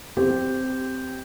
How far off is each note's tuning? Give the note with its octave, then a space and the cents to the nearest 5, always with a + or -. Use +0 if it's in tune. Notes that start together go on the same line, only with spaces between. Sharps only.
C4 -10 G4 +0